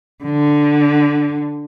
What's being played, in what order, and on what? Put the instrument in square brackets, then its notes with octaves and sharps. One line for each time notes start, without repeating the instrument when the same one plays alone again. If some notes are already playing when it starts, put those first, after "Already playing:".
[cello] D3